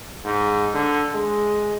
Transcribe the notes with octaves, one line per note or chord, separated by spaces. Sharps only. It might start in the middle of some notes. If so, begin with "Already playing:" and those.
G#2
D3
G#3